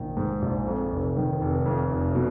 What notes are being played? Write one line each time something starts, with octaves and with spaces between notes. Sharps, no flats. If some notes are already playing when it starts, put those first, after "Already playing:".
Already playing: A#1 D#3
G#2
A#1
F2
F1
D#3
F1
F2
F1
B2